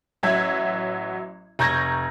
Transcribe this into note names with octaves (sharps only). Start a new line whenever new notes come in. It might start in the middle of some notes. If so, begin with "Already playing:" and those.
A1 F#3 E5 G#6
F1 A#5 C#6 G6 G#6 A#6